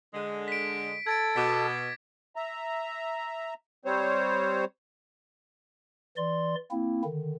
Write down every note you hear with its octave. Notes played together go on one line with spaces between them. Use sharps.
D3 G#3
B6 D7
A4 G#6 A6 D7
B2 D6 B6
E5 A#5
G3 C4 C5 C#5
E3 D5 C6
A#3 C4 E4
D3 D#3